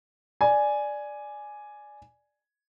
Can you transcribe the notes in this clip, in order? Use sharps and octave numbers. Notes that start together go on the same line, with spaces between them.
D5 G#5